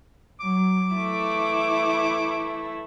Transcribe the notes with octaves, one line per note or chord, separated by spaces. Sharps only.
F#3 D6
E3 A3 E4